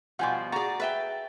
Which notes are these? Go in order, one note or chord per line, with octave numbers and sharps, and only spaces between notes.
B2 F3 G3 F4 F#5 G#5 C6 D6
F#4 G#4 D5 A#5 A6
B4 E5 G5